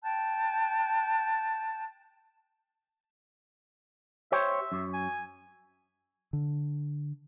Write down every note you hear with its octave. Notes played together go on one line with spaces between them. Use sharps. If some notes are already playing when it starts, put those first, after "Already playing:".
G5 A5 F#6 G6
G4 C5 C#5 E5
F#2
G#5
D3